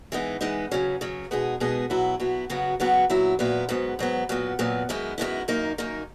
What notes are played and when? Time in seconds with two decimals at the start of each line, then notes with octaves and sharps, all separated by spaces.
0.12 E3 G#3 B3 D#4
0.41 E3 G#3 B3 D#4
0.71 C#3 F#3 C#4
1.01 C#3 F#3 C#4
1.31 B2 G#3 B3 D#4 G#4
1.60 B2 G#3 B3 D#4 G#4
1.90 B2 F#3 B3 E4
2.20 B2 F#3 B3 E4
2.50 C#3 F#3 B3 F#4
2.80 C#3 F#3 B3 F#4
3.10 A#2 F#3 B3 E4
3.39 A#2 F#3 B3 E4
3.69 G#2 F#3 B3
3.99 G#2 F#3 B3
4.29 A#2 F#3 B3
4.59 A#2 F#3 B3
4.89 F#2 D#3 G#3 B3 E4
5.18 F#2 D#3 G#3 B3 E4
5.48 F#2 D#3 A#3 D#4
5.78 F#2 D#3 A#3 D#4